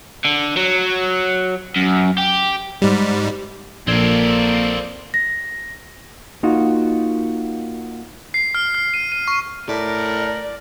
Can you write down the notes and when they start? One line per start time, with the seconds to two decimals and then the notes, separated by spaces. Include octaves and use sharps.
0.25 D3
0.57 F#3
1.76 F#2
2.18 G4
2.82 G#2 G3
3.87 A#1 F2 A#3 C4 A4 A#4 D5 G#6
5.14 A#6
6.43 A#3 D#4 F4 F#4
8.34 C7
8.55 F6
8.75 F6
8.94 D#7
9.12 D#7
9.28 C#6
9.69 A2 A#4 D5